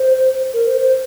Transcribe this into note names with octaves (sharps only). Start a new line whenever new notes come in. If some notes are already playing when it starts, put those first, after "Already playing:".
Already playing: C5
A#4
C5
C5